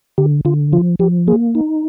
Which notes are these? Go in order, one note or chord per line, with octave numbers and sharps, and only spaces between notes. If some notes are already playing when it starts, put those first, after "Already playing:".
D3 G4
D3 F4
F3 F4
F3 G4
A#3 G#4
D#4